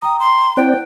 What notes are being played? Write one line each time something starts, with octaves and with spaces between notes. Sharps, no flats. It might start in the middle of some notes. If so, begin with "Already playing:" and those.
G5 A#5 D#6
C6
C4 E4 C5 D5 F#5 G5 F#6